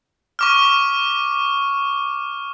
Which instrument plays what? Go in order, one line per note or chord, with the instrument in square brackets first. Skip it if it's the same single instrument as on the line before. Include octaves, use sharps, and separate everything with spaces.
[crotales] C#6 D6 F6